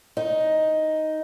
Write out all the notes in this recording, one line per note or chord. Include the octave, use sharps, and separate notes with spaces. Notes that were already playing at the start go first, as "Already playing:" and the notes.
D#4